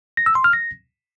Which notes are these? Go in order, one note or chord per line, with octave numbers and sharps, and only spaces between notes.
A#6
E6
C6
F6
A#6